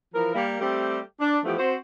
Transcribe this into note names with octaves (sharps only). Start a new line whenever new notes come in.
E3 F3 A#4
G3 A#3
G3 A3 C4 G4
D4
E3 F3 A3 B3 G4
C4 F#4 C5